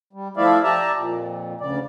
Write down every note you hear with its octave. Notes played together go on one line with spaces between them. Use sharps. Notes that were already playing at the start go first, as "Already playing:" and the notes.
G3
F3 A3 E4 D5 E5 F5
G4 D5 E5 A5 A#5
F2 A#2
D2 C#3 D5